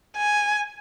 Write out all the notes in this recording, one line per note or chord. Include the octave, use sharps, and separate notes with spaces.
G#5